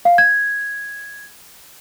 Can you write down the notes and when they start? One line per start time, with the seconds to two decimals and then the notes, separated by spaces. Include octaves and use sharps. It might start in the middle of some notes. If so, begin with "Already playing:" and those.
0.05 F5
0.18 G#6